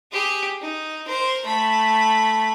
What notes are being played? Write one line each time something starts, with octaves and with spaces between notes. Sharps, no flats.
G4 G#4
D#4
A#4 C5
A3 B5